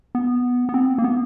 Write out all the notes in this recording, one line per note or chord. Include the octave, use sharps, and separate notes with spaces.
B3
B3
C4
A#3
B3